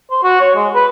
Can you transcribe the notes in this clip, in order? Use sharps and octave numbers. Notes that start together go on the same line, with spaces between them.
C5
F#4
C#5
G#3
B4